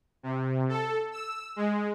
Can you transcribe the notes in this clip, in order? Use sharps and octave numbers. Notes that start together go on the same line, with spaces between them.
C3
A4
E6
G#3